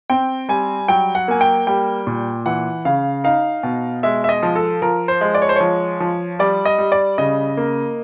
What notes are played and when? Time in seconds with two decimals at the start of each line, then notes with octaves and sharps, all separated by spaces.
0.10 C4 G5
0.49 G3 G#5
0.88 F#3 G5
1.15 F#5
1.28 A#3 G#5
1.41 G5
1.67 G3 G5
2.07 A#2
2.46 E3 F#5
2.85 C#3 F5
3.24 D#4 F5
3.63 B2
4.03 G#3 E5
4.24 E5
4.29 D#5
4.43 F3
4.56 A4
4.82 F3 A#4
5.08 C5
5.21 G#3
5.34 D5
5.42 C#5
5.49 C5
5.56 F3 C#5
6.00 F3
6.39 G3 D5
6.65 D#5
6.78 G3
6.92 D5
7.18 C#3 D#5
7.57 A#3